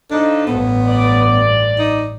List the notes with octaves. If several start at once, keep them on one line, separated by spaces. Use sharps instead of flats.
F3 D4 D#4 A4
A1 G2 B3
D5
D#4